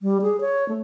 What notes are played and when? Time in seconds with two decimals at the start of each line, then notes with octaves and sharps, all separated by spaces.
0.01 G3
0.22 G#4
0.41 C#5
0.69 A3